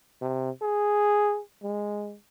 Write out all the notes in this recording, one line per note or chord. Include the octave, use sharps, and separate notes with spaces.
C3
G#4
G#3